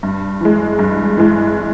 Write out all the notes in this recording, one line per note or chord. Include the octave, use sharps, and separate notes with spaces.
G2
E3 G#3
G2
E3 G#3